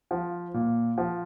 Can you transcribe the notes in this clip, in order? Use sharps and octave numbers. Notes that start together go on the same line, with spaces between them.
F3
A#2
F3